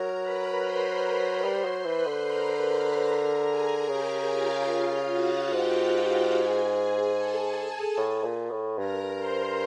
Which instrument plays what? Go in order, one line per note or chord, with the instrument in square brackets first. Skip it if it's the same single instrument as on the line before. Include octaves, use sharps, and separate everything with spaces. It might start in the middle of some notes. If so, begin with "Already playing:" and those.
Already playing: [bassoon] F#3 [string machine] A#4 A#5
[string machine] B4 B5
C5 C6
B4 B5
[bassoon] G3 [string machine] C5 C6
[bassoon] F#3
[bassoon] E3 [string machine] B4 B5
[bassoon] D3
[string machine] A#4 A#5
A#4 A#5
A#4 A#5
G#4 G#5
[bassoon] C#3 [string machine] G4 G5
[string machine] F4 F5
F4 F5
F#4 F#5
[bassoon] G#2 [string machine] G4 G5
[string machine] F#4 F#5
G#4 G#5
G#4 G#5
A4 A5
A4 A5
[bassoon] A2
A#2
A2
[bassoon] G2 [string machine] A#4 A#5
[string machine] C5 C6